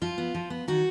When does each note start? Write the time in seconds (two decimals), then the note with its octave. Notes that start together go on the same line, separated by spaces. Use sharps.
0.01 F3 F4
0.18 B3
0.34 F3
0.50 B3
0.68 D#3 F#4